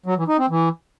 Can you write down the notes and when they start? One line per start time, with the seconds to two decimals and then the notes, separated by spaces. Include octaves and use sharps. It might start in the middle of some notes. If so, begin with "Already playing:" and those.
0.06 F#3
0.17 E3
0.28 D#4
0.39 C4
0.50 E3